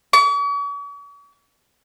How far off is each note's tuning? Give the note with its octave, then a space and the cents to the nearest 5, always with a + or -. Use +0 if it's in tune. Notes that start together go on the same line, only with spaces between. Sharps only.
C#6 +45